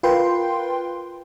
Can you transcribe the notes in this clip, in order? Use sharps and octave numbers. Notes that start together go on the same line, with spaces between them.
F4 A#4 B4 G5 C6